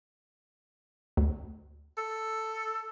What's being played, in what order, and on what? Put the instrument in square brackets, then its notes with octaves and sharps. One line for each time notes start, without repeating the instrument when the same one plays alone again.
[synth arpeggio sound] D2
[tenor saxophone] A4